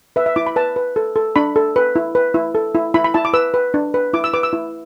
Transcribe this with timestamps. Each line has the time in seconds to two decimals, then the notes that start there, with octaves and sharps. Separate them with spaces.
0.16 B4 E5
0.26 E5
0.36 E4 D6
0.46 B5
0.56 B4 A5
0.76 B4
0.96 A4
1.16 A4
1.36 D4 B5
1.56 A4
1.76 B4
1.96 E4
2.15 B4
2.34 E4
2.55 A4
2.75 E4
2.94 E4 B5
3.04 B5
3.14 E4 A5
3.25 D6
3.34 B4 E6
3.54 B4
3.74 D4
3.94 B4
4.13 E4 D6
4.24 E6
4.34 B4 D6
4.43 E6
4.53 E4